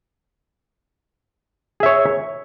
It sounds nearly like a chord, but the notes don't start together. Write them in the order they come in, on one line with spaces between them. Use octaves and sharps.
G#4 E5 C#5